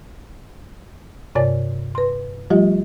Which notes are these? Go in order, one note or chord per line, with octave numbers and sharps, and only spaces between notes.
G2 C3 C#5 D5 G#5 A6
B4 C6
F3 G3 A3 F4 G4 D#5